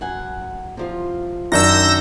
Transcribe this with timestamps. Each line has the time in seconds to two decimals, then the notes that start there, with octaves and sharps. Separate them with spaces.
0.01 F#2 F#5 G#5
0.77 C3 F3 F4
1.52 F#2 D#3 D4 E6 G6 A#6